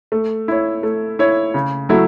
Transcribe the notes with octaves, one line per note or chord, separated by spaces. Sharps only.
A3
E4 C#5
A3
E4 C#5
C#3
F#3 A3 E4